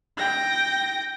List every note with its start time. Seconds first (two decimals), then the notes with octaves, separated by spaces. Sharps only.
0.18 G5 A#6